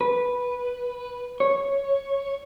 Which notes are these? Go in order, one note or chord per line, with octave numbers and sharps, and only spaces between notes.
B4
C#5